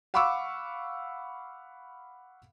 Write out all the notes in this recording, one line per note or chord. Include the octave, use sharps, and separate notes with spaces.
F5 F#5 B5 C#6 D6 E6